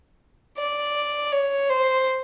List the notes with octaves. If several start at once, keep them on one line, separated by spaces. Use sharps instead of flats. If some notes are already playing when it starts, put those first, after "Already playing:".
D5
C#5
C5